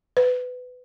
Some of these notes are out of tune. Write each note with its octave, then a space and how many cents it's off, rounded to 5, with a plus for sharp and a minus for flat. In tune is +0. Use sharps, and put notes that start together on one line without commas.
B4 +20